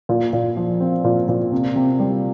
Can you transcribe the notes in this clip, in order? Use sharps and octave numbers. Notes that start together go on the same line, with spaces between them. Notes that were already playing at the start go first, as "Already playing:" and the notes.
A#2
A#2
F3
C4
A#2
A#2
C3
C3
G3